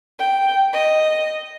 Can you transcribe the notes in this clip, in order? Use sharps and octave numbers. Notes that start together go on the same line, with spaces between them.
G5
D#5